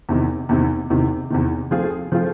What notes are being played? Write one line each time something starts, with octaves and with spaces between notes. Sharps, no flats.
E2 C3 D#3
E2 C3 D#3
E2 C3 D#3
E2 C3 D#3
F3 A3 C4 F4 G#4
F3 A3 C4 F4 G#4